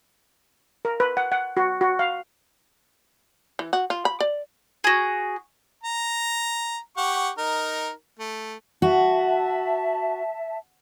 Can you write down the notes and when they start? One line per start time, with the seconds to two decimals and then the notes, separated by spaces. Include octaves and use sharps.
0.85 A#4
1.00 B4
1.17 F#5
1.32 F#5
1.57 F#4
1.81 F#4
1.99 F5
3.59 E3
3.73 F#4
3.90 F4
4.05 B5
4.20 D5
4.84 F#4 G#4
5.83 A#5
6.97 G4 F#5 C#6
7.38 D#4 A#4
8.19 A3
8.82 F#4 E5 A5